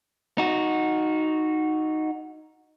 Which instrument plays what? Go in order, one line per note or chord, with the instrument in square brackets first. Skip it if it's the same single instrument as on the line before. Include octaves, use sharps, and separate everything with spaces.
[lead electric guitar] D#4 F#4